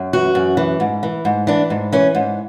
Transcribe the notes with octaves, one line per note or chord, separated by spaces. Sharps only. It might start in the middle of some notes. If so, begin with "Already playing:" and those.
Already playing: F#2
E3 F#4
F#2
E3
G#2
E3
G#2
E3 D4
G#2
E3 C#4
G#2